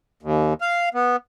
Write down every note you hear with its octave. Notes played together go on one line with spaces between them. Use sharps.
D#2
F5
B3